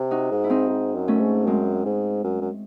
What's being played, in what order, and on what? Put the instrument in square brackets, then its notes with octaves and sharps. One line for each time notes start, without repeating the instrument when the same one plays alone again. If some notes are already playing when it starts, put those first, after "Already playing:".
Already playing: [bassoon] C3
[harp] D#4 F#4
[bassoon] G#2
[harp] E4
C4 D#4
[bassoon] G#2
F#2
[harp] A3 C#4
[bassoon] G#2
[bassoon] F#2 [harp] G#3 C4
[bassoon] G#2
F#2
F#2